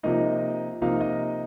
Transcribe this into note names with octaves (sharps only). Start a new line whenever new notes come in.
C3 F3 A#3 D#4 D#5
C3 F3 A#3 D#4 F5
D#5